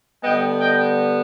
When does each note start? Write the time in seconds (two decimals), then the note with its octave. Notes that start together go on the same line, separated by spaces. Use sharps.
0.23 D3 G3 B3 D#5 G5
0.60 D#5 G5